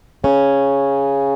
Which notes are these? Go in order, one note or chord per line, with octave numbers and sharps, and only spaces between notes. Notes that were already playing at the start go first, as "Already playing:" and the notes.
C#3 C#4